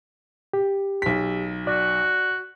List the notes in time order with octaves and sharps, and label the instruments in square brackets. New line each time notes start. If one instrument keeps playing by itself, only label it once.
[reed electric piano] G4
[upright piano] B1 B6
[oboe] F#4 [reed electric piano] D5